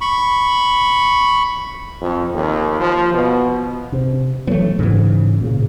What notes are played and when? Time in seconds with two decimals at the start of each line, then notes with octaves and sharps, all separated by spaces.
0.01 B5 C#6
2.01 F2
2.34 D#2
2.80 F3
3.14 B2
3.92 C3
4.47 E3 F#3 A3 B3
4.79 G#2 C#3 E3
5.41 A#2 C#3